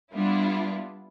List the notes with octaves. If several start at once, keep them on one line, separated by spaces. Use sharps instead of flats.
G3 B3 D4 E4 F4